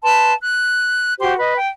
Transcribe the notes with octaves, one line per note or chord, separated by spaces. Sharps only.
B4 A5 C6
F#6
F#4 G4 C5 C6
B4 D#5
G5